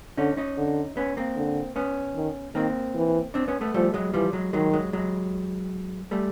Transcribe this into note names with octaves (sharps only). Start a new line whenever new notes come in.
D3 C#4 D#4
C#4 D#4
D3
B3 C#4
A#3 C4
D3
B3 C#4
D#3
D#3 A#3 C4
E3
C4 D4
B3 C#4
A3 B3
F3 G3 A3
F#3 G#3
E3 F3 G3
F#3 G#3
D#3 F#3 G#3
F#3 G#3
F#3 G#3
G3 A3